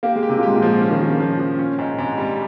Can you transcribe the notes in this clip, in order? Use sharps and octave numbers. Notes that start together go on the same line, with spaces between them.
A#3 G4
G#3
G4
C3
A#2
G#2 G4
A#2
F3
C#3 C#4
D#3
C#3 F3
A#2
A#2 F3
F3
C#4
G#2
G#2 C3
G3